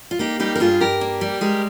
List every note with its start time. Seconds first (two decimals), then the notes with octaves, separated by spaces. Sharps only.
0.11 F4
0.19 A#3 D#4 G4
0.40 G3 D#4 G4
0.55 A#4
0.60 G2 F4 G#4
0.81 G2 G4 A#4
1.01 A#3
1.21 G3
1.41 G#3 G4 A#4